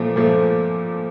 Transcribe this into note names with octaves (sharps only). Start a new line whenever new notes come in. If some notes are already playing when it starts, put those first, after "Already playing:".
Already playing: A#2 F3 A3
A#2 F3 A3